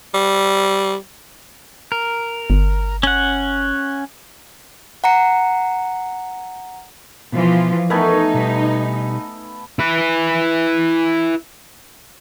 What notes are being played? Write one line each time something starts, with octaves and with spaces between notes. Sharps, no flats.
G3
A#4
G1
C#4 F#5
F#5 A#5 C#7
B2 E3 F3 F4
A3 B3 D#4 A#4 B4 G#5
B2 G3 B4
E4 B4